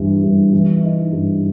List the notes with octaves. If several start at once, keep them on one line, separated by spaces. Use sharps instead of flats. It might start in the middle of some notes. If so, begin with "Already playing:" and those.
Already playing: G2 E3
G2
E3
D#4
G2